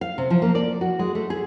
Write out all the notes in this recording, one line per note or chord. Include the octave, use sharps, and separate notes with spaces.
F5
C3
F3
A#3
D5
F#4
G#3
A3
G#4